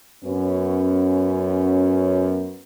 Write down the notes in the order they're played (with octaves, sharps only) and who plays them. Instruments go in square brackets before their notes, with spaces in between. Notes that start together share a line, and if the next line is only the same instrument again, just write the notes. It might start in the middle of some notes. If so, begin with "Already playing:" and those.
[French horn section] F#2 B3 C#4